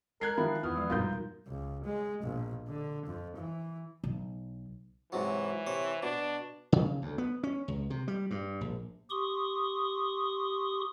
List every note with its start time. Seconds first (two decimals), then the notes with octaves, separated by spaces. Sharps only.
0.21 G#3 A#4 F#6 G#6 C7
0.37 D#3 F3 E4 B5
0.63 E2 B3 E4 F4 F6
0.76 F3 G#3
0.90 G2 B2 G3 D#4 F4 F#4 A#4 G6
1.03 E1
1.47 C#2
1.84 G#3
2.23 A#1 B2
2.68 D3
3.06 F2
3.37 E3
4.04 B1
5.12 G#2 C3 E3 F#3
5.67 C3 C#5
6.03 B2 D4
6.72 C#3
7.02 D2
7.18 B3
7.43 C#4
7.68 C#2
7.90 C3
8.08 G3
8.31 G2
8.61 A#1
9.10 G4 C6 C#6 D#6